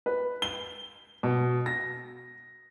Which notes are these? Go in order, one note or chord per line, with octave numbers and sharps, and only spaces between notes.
B4
G7
B2
A#6